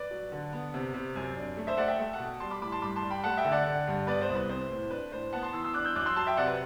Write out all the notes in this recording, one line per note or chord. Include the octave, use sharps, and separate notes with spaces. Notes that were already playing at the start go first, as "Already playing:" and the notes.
Already playing: B4 D5
F#3
D3
B3
C3
C3
F#2
D4
A3
C5 E5
A3 D5 F#5
E5 G5
A3 E5 G5
F#5 A5
B2
G3 A5 C6
B5 D6
A2 B5 D6
A5 C6
G2 B5 D6
A5 C6
G3
G5 B5
A3 F#5 A5
E5 G5
D3
D5 F#5
D3
G2
B3 B4 D5
C5
C2
B4
C4 C5
A2
D4 B4
A2 C5
B3 F#5 A5
A5 C6
E3 C6 E6
C6 E6
D4 D6 F#6
E6 G6
F#2 D6 F#6
C6 E6
F#3 A5 C6
E5 G5
C3 D5 F#5
B4